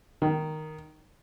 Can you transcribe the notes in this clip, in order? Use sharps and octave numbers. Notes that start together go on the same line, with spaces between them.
D#3